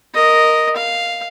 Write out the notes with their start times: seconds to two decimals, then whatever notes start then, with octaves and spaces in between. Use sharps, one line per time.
0.15 A#4 D#5
0.76 F5